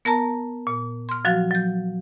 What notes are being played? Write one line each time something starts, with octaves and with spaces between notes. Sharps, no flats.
B3 A#4 A5 A#5
A#2
C6 F6
F3 F#3 F#4 F5
F#3 G6